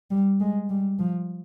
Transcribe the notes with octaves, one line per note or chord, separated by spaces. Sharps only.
G3
G#3
G3
F3